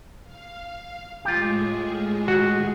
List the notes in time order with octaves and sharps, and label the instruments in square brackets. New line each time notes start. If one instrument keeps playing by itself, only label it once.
[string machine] F5
[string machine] A2 G#3 G#4 [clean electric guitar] F4 G4
[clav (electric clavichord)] F#4